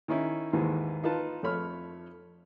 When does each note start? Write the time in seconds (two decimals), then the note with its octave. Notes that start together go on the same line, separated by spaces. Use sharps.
0.08 D#3 C#4 D#4 E4
0.53 D#2 G#2 D#3 E3
1.04 D#4 F4 B4 A5
1.43 F2 A3 C#5 B5 F6